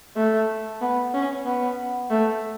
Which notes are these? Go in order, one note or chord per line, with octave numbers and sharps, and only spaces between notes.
A3
B3
C#4
B3
A3